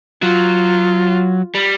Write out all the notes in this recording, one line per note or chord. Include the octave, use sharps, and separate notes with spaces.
F#3 F4
G3